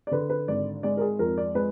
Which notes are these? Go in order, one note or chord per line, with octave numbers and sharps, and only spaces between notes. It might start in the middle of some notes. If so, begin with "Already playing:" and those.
D5
D3 B4
B4
G#1 D5
G#3 D5
A#4
G#4
F2 A#4
D5
G#3 B4